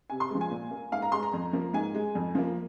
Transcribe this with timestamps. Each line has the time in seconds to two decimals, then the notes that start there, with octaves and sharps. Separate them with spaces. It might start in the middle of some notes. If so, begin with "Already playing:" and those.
0.10 C3 G#5
0.20 C6
0.30 F3 G#3
0.41 G#5
0.51 A#2
0.71 A#3
0.92 G#2 F5
1.02 A#5
1.12 G#3 C6
1.23 A#5
1.34 F2
1.53 F3 A#3
1.73 G#2 G#5
1.95 G#3
2.15 F2
2.35 F3 A#3